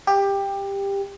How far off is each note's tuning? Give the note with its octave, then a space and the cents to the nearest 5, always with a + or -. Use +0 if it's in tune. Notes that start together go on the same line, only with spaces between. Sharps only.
G4 +15